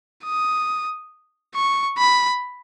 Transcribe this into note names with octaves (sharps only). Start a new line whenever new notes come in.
D#6
C#6
B5